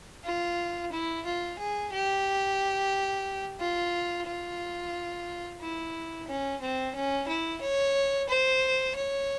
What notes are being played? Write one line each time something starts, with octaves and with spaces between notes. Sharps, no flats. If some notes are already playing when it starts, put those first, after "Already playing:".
F4
E4
F4
G#4
G4
F4
F4
E4
C#4
C4
C#4
E4
C#5
C5
C#5